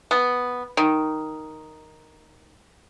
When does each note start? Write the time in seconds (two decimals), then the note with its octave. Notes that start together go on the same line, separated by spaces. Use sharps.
0.11 B3
0.77 D#3